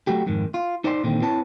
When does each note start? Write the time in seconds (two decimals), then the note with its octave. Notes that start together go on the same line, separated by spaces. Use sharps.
0.07 F#3 A3 F#4 G4
0.26 F2 G#2 D#3
0.54 F4
0.84 D#4 C5 D5 D#5 G#5 C6
1.04 A#2 D3 D#3 C4
1.22 C4 E4 B4 C#5 A5